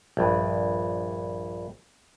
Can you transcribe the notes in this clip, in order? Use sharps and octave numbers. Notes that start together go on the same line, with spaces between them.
A#1 G2